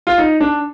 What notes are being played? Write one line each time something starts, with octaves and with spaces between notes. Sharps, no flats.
F4
D#4
D4